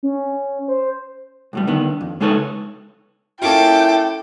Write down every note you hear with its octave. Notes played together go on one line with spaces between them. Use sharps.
C#4
C5
B1 A2 G3
D3 D#3 B3
F2
C#3 G#3 D#4 A4 B4 C#5
A#3 C#4 E4 F4 A4 G5 D6